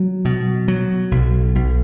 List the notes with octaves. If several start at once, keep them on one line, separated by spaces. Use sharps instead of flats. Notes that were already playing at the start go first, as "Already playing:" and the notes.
Already playing: F#3
B2
F#3
B1
B1